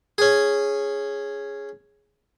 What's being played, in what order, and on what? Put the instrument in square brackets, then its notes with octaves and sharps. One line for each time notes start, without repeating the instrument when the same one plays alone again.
[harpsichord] C#4 G#4